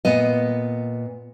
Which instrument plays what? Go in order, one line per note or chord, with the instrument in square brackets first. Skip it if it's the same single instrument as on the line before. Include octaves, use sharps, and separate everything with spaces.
[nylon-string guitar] A#2 B3 D#5